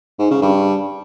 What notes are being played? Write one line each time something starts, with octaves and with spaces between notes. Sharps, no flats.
G#2
C#3
G2